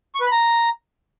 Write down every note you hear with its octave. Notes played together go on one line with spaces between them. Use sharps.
C#6
B4
B5
A#5